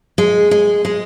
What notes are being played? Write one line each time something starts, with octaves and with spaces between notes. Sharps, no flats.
G#3
G#3
G#3